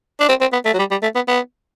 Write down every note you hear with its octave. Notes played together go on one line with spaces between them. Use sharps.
D4
C4
C4
B3
A3
F#3
G3
G3
A3
B3
B3